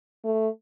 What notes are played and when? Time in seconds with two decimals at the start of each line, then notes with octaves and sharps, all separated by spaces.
0.24 A3